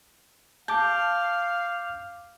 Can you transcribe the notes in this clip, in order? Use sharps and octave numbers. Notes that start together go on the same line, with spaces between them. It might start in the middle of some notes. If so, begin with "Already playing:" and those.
F5 A5 D6 G6